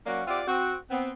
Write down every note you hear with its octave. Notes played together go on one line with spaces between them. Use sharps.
F#3 A#3 C#4 F#4 D5 F5
C4 F4 G4 D5 E5 F#5
C4 F#4
B3 C4